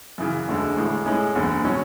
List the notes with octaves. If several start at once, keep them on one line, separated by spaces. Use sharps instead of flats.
F#2 C#3 E3
E1 D2 D3 G#3
A1 A2 G#3
A2 G#3 C#4 G#4
F#1 E2 D3
B2 F#3 C#4